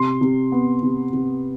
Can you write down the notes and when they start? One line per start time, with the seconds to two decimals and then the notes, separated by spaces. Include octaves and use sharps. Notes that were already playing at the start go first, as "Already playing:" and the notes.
Already playing: C3 C6
0.21 C3
0.52 B3
0.83 C3
1.13 C3